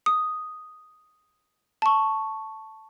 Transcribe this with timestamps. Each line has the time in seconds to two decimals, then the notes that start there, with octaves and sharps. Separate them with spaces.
0.06 D#6
1.82 A5 C#6